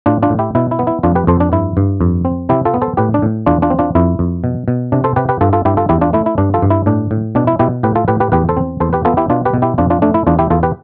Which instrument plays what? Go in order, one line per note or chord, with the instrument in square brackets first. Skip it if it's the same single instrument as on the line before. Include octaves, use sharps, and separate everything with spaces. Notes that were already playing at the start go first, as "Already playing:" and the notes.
[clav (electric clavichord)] A2 D4 F4
D4 F4
A2
E4 G4
B2 E4
E4
B3
E4
F2 D4 F4
G4 B4
F2 A4 C5
D4
G2 E4
G2
F2
C4
C3 E4 G4
F4 A4
B3
A4 C5
A2 G4 B4
D4
A2
E2 D4 F4
D4 F4
C4
D4 F4
F2 E4
F2
B2
B2
C3 D4
A4 C5
C3 G4 B4
G4 B4
G2 F4 A4
F4 A4
G2 E4 G4
F4 A4
E2 E4 G4
D4 F4
A3 E4
E4
G2 D4
F4 A4
G2
E4
A2 D4
A2
B2 D4
E4
B2 E4 G4
A2 G4 B4
F4 A4
A2 G4 B4
G4 B4
E2 G4 B4
A4 C5
C4
E2 A4 C5
G4 B4
B3 F4 A4
E4 G4
B2 D4 F4
G4 B4
B2
E4 G4
F2 D4 F4
D4 F4
A3 D4
E4
E2 D4 F4
E4 G4
E2 F4 A4
G4 B4